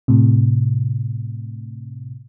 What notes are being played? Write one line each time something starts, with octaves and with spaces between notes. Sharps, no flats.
A2 C3